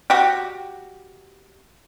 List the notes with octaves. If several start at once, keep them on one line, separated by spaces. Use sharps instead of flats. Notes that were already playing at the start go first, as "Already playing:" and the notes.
F#4 G4